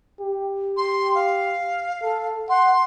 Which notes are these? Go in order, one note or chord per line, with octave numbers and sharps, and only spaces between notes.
G4
C6
F5
A4
F#5 C6